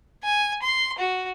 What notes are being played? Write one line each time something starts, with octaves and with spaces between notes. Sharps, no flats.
G#5
C6
F#4